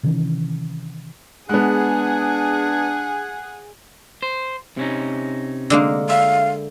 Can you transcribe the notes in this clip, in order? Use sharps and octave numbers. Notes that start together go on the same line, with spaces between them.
C3 D#3 E3 C#4
G#3 B3 D4 G#4 F#5
C5
C3 C#4 D#4
D3 G#3 A#3
E5 F5